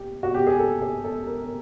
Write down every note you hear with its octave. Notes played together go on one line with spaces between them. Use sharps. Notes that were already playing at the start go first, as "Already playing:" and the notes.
Already playing: G4
F#4
G4
G#4
A4
G#4
A4
A#4
A#4